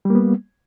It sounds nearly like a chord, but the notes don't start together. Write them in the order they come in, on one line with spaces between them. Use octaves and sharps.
G3 A#3 B3